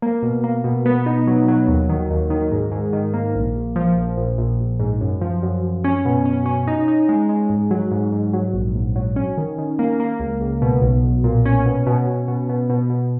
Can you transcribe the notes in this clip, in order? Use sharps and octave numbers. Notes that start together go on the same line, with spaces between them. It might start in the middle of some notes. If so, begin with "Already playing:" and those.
A#3
B2
A#3
B2
B3
D#4
F#3
F#3
D#2
D#3
D#2
D#3
G#2
G#2
D#3
A#3
A#1
A#1
F3
A#1
A#1
A#1
A#1
G#2
F#2
F3
F#2
F#2
C#4
B2
C#4
C#4
D#4
D#4
G#3
G#3
G#2
F#3
G#2
G#2
F#3
A#1
A#1
F#3
C#4
D#3
D#3
A#3
A#3
C#2
C#2
B2
B1
B1
A#2
C#4
B2
B2
B2
B2
B2
B2
B2